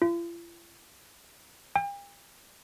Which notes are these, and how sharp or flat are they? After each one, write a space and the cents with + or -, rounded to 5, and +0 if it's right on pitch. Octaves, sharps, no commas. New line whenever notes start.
F4 -45
G5 +40